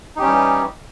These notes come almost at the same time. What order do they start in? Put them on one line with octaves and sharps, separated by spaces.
D#4 G4 C#4 G3 E3